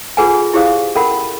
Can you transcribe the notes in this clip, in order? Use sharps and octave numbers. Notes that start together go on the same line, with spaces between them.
F4 G#4 A4 B4 F#5 G#5
E4 G4 G#4 C5 F5 D#6
C#4 A4 A#4 F#5 B5